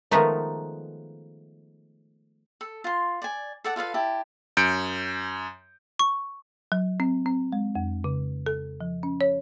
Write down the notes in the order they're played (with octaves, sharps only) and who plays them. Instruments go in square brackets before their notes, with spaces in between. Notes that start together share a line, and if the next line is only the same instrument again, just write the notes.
[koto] D#3 F3 G#3 A3 B3 D#4
[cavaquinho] A4
F4 C6
D5 G#5
A4 D5 F#5
F4 A4 B4 F5
E4 G4 A5
[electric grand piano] F#2 G6 C#7 D7
[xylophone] C#6
[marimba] F#3
C4
C4
G#3
F2
C#3
A4
F3
C#4
C#5